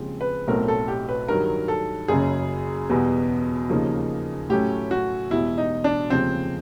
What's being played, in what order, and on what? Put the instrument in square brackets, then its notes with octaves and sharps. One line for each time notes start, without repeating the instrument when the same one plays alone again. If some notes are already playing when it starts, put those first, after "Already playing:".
Already playing: [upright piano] D#2 C#3 F3 G#3 C4
[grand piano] B4
[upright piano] B1 A2 F#3 A3 C4 [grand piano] A#4
[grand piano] A4
G4
B4
[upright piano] G2 D#3 F#3 [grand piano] A#4
[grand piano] A4
[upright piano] F#1 F#2 C#3 [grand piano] G#4
[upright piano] E2 B2 G3 B3
D#2 C#3 F3 A#3 D#4
[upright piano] A2 F#3 A3 C#4 [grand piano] G4
[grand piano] F#4
[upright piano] E1 E2 B2 G3 [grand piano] E4
[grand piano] D#4
D4
[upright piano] F1 D#2 C#3 F3 [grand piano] C4